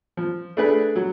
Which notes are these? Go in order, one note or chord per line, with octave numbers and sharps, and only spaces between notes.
F3
A3 D4 G#4 B4
F#3